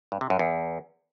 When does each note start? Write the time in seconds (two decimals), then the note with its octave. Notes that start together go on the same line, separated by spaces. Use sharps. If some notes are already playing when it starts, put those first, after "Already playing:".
0.12 G2
0.21 C3
0.30 F#2
0.39 E2